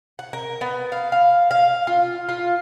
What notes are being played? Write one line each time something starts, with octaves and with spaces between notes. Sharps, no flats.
F#5
A#4
B3
F5
F5
F5
F4
F4